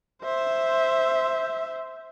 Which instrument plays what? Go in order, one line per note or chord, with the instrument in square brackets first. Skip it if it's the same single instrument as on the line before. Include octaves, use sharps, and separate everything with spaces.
[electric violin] C5 E5